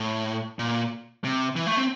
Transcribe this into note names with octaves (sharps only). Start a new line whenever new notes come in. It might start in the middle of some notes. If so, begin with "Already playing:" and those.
Already playing: A2
A#2
C3
E3
A3
C4